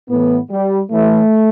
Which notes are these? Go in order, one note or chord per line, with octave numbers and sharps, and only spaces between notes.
A2 E3 B3
G3
A2 E3 A3